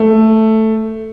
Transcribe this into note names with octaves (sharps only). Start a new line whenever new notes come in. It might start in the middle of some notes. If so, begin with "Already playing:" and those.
Already playing: A3